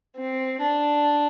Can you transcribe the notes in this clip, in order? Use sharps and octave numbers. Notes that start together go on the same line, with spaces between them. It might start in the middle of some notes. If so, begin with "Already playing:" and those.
C4
D4